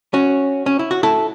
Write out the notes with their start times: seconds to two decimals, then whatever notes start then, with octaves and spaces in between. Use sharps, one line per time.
0.14 C#4 F#4
0.66 C#4
0.79 E4
0.91 F#4
1.03 E4 A4